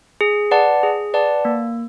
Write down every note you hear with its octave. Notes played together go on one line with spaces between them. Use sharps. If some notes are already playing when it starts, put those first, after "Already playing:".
G#4
B4 D5 F#5 A5
G#4
B4 D5 F#5 A5
A#3